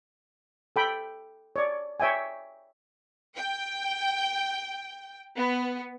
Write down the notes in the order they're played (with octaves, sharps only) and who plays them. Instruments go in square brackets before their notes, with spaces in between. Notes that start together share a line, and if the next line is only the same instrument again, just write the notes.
[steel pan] A4 G5 B5
C#5 D5
C#5 E5 G5 G#5
[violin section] G5
B3